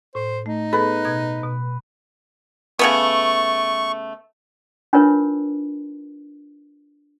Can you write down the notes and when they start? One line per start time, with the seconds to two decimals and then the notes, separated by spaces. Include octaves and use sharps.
0.15 A2 C5
0.46 A3 D#4
0.73 B3 G#4 A4 B4
1.05 B2 G#6
1.43 B2
2.79 C#3 A3 B3 C#6
4.93 D4 D#4 F4 A#4 B4 C#5